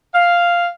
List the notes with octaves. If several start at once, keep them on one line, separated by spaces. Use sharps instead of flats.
F5